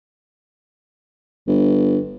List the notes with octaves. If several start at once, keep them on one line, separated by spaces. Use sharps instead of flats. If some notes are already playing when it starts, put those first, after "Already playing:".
G1